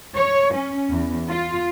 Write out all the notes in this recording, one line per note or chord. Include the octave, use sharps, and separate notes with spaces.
C#5
C#4
E2
F4